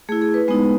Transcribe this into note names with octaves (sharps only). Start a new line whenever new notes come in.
A3 E4 G#4
G#4
B4
G#3 B3 D#4